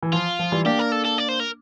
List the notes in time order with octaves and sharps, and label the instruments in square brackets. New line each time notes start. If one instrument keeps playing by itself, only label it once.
[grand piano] E3
[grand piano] F3 [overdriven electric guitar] F4
[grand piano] F3
E3 G3
[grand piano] A#3 D4 [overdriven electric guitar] G4
[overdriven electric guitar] A#4
A4
A4
D5
C5
A#4